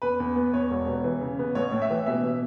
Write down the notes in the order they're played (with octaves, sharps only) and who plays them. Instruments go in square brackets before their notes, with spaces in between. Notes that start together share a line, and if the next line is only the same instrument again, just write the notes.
[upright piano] E2 B4
E2
B3
E2 C#5
E1
B2
E3
C#3
B3
A1 C#5
A2
E5
E3
B2 E5
B2